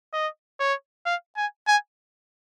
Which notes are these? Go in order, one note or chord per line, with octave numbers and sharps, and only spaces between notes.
D#5
C#5
F5
G#5
G#5